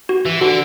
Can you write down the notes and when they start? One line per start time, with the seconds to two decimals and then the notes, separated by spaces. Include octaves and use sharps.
0.09 F#4
0.26 E3
0.41 D3 F#4